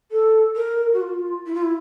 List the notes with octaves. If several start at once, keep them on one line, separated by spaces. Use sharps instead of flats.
A4
A#4
F#4
F4
E4
F4
E4